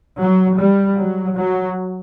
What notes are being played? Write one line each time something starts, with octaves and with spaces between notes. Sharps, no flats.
F#3
G3
F#3
F#3